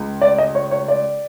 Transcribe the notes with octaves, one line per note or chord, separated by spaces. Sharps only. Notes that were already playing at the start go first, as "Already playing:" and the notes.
Already playing: C#2
D5
D#5
C#5
C#5
D5